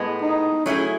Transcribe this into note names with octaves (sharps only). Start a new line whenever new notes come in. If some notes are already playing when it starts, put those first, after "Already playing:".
Already playing: A2 G#3 B3
D#4
F#3 A3 C#4 E4 G#4